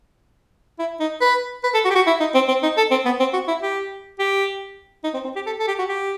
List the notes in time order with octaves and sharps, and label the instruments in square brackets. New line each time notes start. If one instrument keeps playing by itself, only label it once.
[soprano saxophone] E4
D#4
B4
B4
A4
F#4
G4
F#4
E4
D#4
C4
C4
D#4
A4
C4
B3
C4
F#4
E4
G4
G4
D#4
C4
C4
G4
A4
A4
G4
F#4
G4